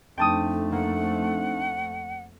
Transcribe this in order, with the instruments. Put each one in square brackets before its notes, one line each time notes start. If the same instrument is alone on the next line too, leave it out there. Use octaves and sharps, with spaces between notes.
[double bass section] F2 A3 [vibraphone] C4 D4 D#4 [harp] G5 A5 D#6
[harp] A#3 [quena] F#5